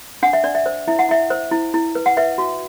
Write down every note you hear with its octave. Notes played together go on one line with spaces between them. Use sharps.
D4 F#5
E5
D4 D5
E5
C5
E4 E5
F#5
E4 E5
C5
E4
E4
B4
F#5
B4 E5
F#4